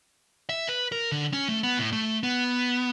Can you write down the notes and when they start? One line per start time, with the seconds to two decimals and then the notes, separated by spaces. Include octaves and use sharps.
0.49 E5
0.68 B4
0.92 A#4
1.12 D3
1.33 C#4
1.49 A3
1.63 B3
1.78 A2
1.93 A3
2.23 B3